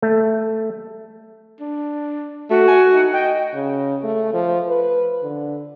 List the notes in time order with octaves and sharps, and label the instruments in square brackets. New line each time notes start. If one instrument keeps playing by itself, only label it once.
[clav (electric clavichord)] A3
[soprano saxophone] D4
[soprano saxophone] A3 [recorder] F#4
[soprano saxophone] G#5
D#4
[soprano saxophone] D#5 [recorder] G5
[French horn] C#3
A3
F3
B4
D3